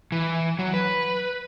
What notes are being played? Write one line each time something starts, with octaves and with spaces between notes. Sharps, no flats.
E3
F#3
B4